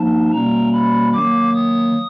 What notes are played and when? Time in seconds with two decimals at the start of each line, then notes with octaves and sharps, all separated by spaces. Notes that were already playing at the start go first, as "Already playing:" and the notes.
Already playing: F3 A#3 D#4 A5
0.32 B2 G3 A#3 C#4 A#5
0.73 B5
1.13 D#3 F#3 A#3 D6
1.54 D#6